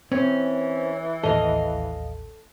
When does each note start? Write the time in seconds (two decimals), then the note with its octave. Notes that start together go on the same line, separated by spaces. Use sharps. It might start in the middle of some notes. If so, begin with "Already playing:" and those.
0.12 E3 C4 C#4
1.24 A1 D#2 A4 D#5 F5